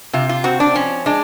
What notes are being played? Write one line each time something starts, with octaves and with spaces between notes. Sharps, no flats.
C3 F4
F4
C4 F#4
D4
F3 C#4
G#3 D4